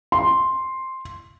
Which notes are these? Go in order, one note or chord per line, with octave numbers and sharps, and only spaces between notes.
C6